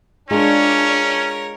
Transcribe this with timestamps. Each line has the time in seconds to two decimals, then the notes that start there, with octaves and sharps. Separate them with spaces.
0.30 G#3 C#4 D4 F4 G#4 A#4 C#5